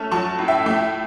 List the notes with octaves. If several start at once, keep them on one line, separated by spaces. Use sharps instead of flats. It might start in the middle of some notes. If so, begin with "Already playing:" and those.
Already playing: A3 C#4 A5
F#3 A5 C#6
A2
E5 G5
A3